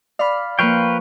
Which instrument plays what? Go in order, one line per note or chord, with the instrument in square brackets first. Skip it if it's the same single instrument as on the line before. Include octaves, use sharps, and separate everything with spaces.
[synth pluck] D5 B5 [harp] F5 F6
[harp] F3 A#3 [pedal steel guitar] B4 F5 G5 [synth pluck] C#6